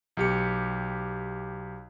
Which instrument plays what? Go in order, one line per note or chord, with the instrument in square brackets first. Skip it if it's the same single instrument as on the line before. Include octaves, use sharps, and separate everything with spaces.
[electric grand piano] B1 G4 C#7